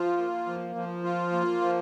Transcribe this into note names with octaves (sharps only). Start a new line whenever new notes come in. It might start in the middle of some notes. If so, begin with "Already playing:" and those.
Already playing: F3 F4
A#3
F3
F3
F4
A#3
F3